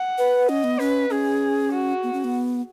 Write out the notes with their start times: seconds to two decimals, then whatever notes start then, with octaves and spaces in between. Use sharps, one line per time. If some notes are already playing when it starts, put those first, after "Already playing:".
Already playing: F#5
0.18 B4
0.49 C#4 D#5
0.64 B3
0.79 C#4 B4
1.10 C#4 G#4
1.73 F#4
2.03 B3
2.13 C#4
2.24 B3